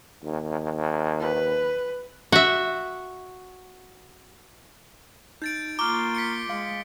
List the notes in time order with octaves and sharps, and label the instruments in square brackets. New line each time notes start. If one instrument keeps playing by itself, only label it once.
[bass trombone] D#2
[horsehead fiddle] B4
[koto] F#4 E5
[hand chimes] D#4 [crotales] G6 A6 D7
[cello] A#3 F4 [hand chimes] A#5 C#6 F6 [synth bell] D6 [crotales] G7
[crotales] B6 C#7 D7
[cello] G#3 [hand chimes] F5